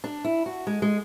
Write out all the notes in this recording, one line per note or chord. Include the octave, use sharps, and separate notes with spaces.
D4
E4
F#4
G#3
G#3